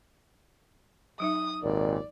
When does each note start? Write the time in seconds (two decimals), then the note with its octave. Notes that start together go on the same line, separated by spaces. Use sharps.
1.20 F#3 D#4 E5 D#6
1.63 G#1 D#2 A#2 D5